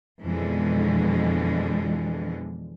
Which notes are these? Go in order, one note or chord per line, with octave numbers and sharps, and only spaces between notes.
F2 B2 D3 E3 G#3